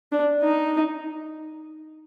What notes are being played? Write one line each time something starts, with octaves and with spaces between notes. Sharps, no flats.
D4
D#4